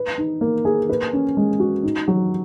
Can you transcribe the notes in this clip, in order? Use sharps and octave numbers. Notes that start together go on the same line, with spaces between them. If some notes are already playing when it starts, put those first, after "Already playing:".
Already playing: B4
D#4
A#3
G#4
B4
C#4
G#3
F#4
D#4
F#3